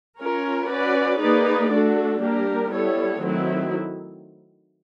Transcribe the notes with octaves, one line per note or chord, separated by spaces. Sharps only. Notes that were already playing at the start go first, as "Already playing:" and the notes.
C#4 F4 A#4 C#5
C#4 F#4 B4 D5
A#3 D#4 G#4 B4 D5
A3 D4 F#4 A4
G3 A#3 D4 G4 A#4
G3 B3 E4 A4 C#5
D#3 F#3 A3 C4 E4